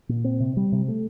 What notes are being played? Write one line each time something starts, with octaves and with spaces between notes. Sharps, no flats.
A#2
C4
C3
G3
C3
A3